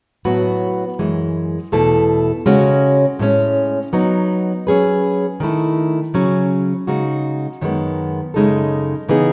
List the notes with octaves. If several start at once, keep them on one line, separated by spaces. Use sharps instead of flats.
A2 F#3 B3 F#4 B4
F#2 E3 G#3
E2 B2 A3 E4 A4
C#3 G#3 C#4 F#4
A2 G#3 C#4
F#3 B3 D#4
F#3 C#4 G#4 B4
D#3 A3 E4
C#3 F#3 C#4
C#3 G#3 D#4 F#4
F#2 D#3 G#3 B3
F#2 C#3 G#3 D#4 A4
C#3 E3 B3 D#4 G#4